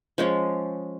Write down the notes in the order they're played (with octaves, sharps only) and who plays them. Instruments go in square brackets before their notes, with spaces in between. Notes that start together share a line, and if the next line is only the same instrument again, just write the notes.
[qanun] F3 G#3 C#4